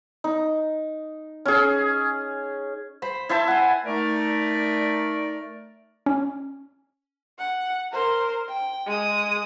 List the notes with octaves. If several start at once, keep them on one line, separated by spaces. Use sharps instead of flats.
D#4
C#4 G#4
C5 B5
E4 C5 E5 A5
F#5 G#5
A3 D#4 A#4 D5
C#4
F#5
A#4 C5
G5
G#3 D#6